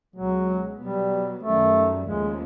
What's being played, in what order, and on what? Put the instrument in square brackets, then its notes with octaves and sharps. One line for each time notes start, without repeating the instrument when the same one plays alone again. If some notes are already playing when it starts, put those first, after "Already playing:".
[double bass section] C#2 B2 G#3 [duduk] F#3
[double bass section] B2 F#3 B3 [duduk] G3
[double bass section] F#2 D#3 G3 [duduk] A3
[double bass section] D#2 C#3 F3 A3 [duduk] G#3